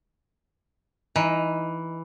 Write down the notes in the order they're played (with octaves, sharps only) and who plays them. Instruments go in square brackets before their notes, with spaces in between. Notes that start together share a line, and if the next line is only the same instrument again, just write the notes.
[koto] E3 [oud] D#4